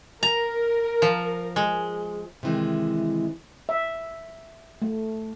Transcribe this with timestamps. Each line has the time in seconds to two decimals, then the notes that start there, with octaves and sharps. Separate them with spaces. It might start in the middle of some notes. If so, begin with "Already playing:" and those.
0.23 A#4 A#5
1.02 F3
1.56 G#3
2.43 C3 D#3 E3 G#3
3.69 E5
4.82 A3